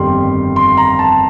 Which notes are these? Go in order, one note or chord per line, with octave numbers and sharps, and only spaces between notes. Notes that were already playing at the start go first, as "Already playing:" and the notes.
Already playing: G1 F2 D#3 G3 C6
C6
A#5
A5